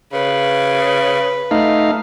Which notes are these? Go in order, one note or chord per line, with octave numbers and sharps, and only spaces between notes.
C#3 B4
A3 D#4 F5